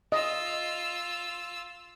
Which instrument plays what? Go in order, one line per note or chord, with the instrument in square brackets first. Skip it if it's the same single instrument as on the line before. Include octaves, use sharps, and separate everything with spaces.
[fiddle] F4 E6 [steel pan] D#5